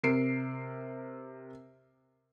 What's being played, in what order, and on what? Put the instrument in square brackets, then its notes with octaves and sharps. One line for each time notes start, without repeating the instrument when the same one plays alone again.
[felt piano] C3 A#4 C7 D7